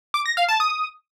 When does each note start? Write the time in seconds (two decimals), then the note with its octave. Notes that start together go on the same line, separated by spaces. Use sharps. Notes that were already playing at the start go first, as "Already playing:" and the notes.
0.14 D6
0.26 A#6
0.37 F5
0.49 A5
0.60 D#6